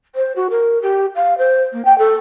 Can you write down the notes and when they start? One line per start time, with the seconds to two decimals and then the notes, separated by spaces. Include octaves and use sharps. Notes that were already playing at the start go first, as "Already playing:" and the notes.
0.15 C5
0.36 F#4
0.50 A#4
0.82 G4
1.16 F5
1.38 C5
1.73 A#3
1.85 G5
1.98 A4